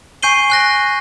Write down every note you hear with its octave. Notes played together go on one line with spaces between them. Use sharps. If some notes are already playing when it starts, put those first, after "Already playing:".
G#5 C#6 G6 C7 D#7 G7
G#5 F#6 A#6